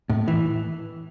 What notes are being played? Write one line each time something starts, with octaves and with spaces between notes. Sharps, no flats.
A2
E3